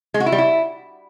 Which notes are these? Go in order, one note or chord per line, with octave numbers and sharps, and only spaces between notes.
G#3
F#4
E4
G3
E4